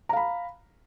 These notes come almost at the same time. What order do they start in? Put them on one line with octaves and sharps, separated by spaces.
A#5 F5 B5